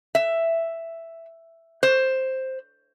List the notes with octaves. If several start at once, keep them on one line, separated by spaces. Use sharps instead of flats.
E5
C5